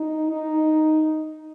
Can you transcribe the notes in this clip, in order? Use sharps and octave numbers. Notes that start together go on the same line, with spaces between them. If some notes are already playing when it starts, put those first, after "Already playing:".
Already playing: D#4
D#4